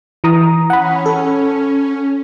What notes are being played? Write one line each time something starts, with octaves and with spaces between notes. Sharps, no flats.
E3 A#5 D#6
C#4 F#5 B5
A4